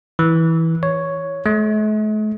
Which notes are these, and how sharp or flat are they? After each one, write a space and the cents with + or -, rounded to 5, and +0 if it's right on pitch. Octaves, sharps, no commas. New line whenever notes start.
E3 -15
C#5 +5
A3 -45